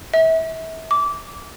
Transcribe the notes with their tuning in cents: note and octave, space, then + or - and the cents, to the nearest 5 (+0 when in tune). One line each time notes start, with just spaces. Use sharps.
E5 -30
D6 -20